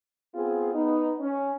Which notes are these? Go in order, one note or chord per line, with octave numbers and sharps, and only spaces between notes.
B3 C4 F4 G#4
B3 D#4
C#4